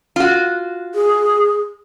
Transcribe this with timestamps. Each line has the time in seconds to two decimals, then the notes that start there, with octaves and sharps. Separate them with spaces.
0.16 F4 F#4
0.95 G#4